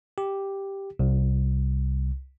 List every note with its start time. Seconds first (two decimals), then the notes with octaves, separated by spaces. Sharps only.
0.18 G4
0.99 C2